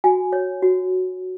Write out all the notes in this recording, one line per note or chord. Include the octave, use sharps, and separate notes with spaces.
F#4 G#5
C#5
F#4